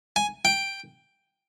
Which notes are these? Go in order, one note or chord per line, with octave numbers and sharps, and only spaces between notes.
G#5
G5